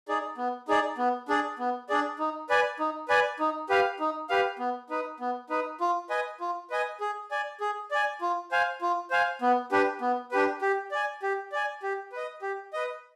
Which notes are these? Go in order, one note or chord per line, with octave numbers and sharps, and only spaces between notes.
D#4 G#4 D5
B3
D#4 G#4 D5
B3
D4 G#4 D5
B3
D4 G#4 D5
D#4
B4 D5 G#5
D#4
B4 D5 G#5
D#4
G4 B4 F5
D#4
G4 B4 F5
B3
D#4 B4
B3
D#4 B4
F4
B4 D#5 G#5
F4
B4 D#5 G#5
G#4
D5 G#5
G#4
D5 G#5
F4
C5 F5 G#5
F4
C5 F5 G#5
B3
D4 G4 B4
B3
D4 G4 B4
G4
D5 G#5
G4
D5 G#5
G4
B4 D#5
G4
B4 D#5